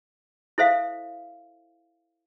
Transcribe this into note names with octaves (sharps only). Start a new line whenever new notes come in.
E4 A4 C5 E5 F5